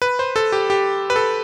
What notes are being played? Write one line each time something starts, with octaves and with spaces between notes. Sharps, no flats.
B4
C5
A4
G4
G4
B4
A4